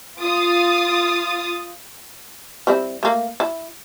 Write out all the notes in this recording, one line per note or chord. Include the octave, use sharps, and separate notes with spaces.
F4 D#6 A6
G3 C4 E4
A3 A#3
E4